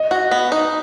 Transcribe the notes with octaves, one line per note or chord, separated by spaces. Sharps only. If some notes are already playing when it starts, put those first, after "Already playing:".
Already playing: D#5
F#4
B3
D#4